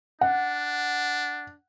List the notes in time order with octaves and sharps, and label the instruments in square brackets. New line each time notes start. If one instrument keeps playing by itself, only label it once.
[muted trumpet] D4 [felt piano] F#5